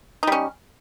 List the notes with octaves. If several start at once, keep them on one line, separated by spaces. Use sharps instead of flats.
G3 C#4 D#4